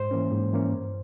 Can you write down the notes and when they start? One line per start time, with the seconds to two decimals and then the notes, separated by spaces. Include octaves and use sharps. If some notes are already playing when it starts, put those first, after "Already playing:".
Already playing: G#2 C5
0.11 E3 A#3 C#4
0.32 G#2
0.53 E3 A#3 C#4
0.72 G2